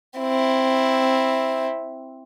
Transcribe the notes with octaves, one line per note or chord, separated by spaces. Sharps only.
C4 E4